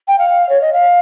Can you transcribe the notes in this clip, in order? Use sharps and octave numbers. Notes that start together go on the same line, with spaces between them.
G5
F5
C#5
D#5
F5